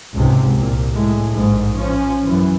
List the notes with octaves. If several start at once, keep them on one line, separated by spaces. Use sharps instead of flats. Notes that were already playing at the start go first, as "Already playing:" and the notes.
G#1 C#2 G#2 C3
C2 A#2
A2 G#3
A#1 G#2
F3 C#4
F#2 E3